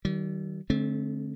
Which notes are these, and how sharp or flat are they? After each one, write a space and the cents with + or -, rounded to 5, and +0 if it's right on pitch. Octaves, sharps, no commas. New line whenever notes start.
D#3 +0 G3 -45
D3 +0 A3 -30 C4 +30